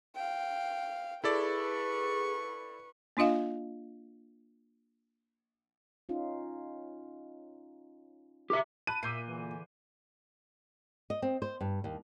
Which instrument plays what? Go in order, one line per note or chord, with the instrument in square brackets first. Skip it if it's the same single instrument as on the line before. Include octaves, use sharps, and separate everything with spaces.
[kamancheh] F5 G5
[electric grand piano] E4 A4 D5 [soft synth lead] G#4 [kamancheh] B4 C#6
[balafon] A#3 D4 F4 D#5 F5
[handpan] C#4 D#4 F4
[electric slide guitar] G4 E5
[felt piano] A5 B5 F#6 [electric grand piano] D#7
[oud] A#2 [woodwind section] A#4 E5 [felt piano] D6 G6 C7
[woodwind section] E2 D3 E3
[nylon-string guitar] D#5
C4
C5
G2
D#2